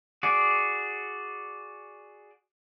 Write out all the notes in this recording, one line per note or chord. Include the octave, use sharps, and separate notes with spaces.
F#4 G#4 D5